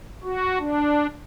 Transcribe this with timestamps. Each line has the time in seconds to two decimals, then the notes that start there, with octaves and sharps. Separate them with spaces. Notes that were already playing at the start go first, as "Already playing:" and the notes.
0.23 F#4
0.59 D4